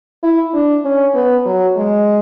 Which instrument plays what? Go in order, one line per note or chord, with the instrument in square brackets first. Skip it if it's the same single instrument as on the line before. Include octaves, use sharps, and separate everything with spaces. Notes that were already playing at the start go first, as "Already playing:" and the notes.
[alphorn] E4
D4
C#4
B3
F#3
G#3